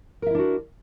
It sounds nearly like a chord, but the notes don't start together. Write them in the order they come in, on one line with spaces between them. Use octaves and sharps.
A#4 E5 E4 D4 F#4